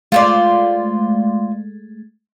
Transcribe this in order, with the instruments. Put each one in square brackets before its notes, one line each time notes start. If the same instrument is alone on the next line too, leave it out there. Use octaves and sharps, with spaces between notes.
[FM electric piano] G#3 A3 [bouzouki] F4 C5 D5